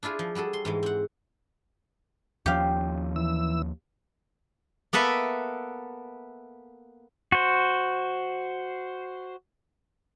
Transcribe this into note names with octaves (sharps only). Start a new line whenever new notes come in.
D4 E4 F4 G#4
F3
G3 F#4 G#4 A4
C6
G#2 E3 G#3
C4 F#5
D#2 F3 C#4 G4 F5
E3 E6
A#3 B3 A4 B4 E5
F#4 C5